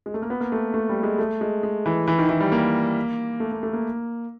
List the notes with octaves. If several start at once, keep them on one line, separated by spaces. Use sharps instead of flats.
G#3
A3
A#3
B3
A#3
A3
A3
G3
G#3
A3
G#3
G#3
E3
E3
D#3
E3
G3
A#3
A3
A#3
A3
A#3